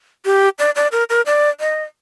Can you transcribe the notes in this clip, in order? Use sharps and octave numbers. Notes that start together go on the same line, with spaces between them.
G4
D5
D5
A#4
A#4
D5
D#5